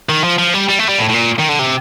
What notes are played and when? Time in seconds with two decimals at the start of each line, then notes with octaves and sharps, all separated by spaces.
0.09 D#3
0.24 F3
0.39 F3
0.54 G3
0.69 G3
0.79 A3
0.89 G3
0.99 A2
1.09 A2
1.14 A#2
1.39 D#3
1.49 D3
1.59 C3